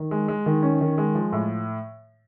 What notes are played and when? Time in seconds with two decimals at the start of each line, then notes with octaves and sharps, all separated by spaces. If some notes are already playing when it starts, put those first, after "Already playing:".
Already playing: D#3
0.11 G#3
0.28 G#3
0.46 D#3
0.63 C#4
0.81 D#3
0.98 G#3
1.15 F3
1.32 A2